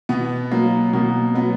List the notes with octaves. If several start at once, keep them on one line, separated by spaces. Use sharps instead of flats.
B2 B3
F#3 A#3
B2 A#3
F#3 B3